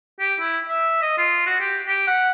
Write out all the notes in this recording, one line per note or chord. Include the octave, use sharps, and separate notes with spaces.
G4
E4
E5
D#5
F4
F#4
G4
G4
F#5